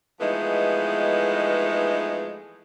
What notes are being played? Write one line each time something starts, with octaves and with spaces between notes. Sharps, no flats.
E3 F3 G#3 A3 B3 D#4